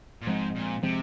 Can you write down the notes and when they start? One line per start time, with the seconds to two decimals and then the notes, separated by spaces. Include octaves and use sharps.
0.21 A#2
0.27 G#2 F3 G#3 C4
0.55 A#2
0.83 C3 F3 G#3 C4